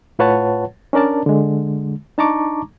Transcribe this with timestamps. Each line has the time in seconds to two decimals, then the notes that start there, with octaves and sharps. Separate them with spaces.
0.19 A2 F4 B4 C#5 F#5 A5
0.93 C#4 D4 A#4 D5 A5
1.26 D3 G#3
2.18 D4 D#4 A5 A#5 C#6 D6